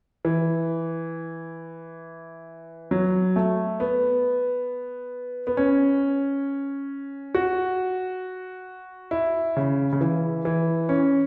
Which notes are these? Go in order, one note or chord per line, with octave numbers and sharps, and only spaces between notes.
E3
F#3
A3
B3
B3
C#4
F#4
E4
C#3
C#3
E3
E3
C#4